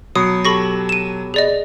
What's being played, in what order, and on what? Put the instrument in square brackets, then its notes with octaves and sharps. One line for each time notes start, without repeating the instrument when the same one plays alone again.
[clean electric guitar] B2 [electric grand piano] F#3 [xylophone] D#6 [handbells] C7
[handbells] G4 A4 A5 [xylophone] B5 C#6 A#6
[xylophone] D#7 E7
G#4 D5 D#5